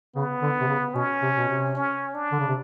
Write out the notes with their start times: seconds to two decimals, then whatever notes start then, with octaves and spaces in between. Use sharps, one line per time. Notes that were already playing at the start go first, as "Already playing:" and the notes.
0.15 C#3 B3
0.42 D3
0.61 C3
0.68 C#3
0.94 B2 C#4
1.22 C3
1.37 B2
1.48 C3
1.75 C#4
2.14 D4
2.32 D3
2.39 C#3
2.48 C3